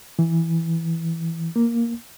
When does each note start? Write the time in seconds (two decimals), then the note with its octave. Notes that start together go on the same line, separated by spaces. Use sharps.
0.19 E3
1.56 A#3